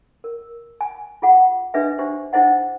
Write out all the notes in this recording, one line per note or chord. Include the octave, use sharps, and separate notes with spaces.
A#4
G#5
F4 G#4 F#5
D4 G#4 B4 D#5 E5
D4 G4 C5
D4 E4 G#4 C5 D#5 F#5